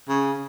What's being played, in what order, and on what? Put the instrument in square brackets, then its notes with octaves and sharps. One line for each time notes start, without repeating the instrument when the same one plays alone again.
[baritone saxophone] C#3